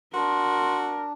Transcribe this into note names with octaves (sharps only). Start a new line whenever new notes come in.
D4 F#4 A#4 C6